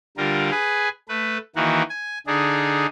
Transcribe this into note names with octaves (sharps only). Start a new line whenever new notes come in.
D3 G3 F4 A#4
G#4 B4 G#5
A3 B4
D#3 E3 A#3 F#4
G#5
D3 D4 D#4 G#4